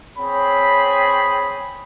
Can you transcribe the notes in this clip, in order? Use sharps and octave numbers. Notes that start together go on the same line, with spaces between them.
C4 G#4 C#5 B5